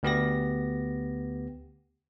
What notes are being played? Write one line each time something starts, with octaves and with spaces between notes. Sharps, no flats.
D2 B3 G4 A#6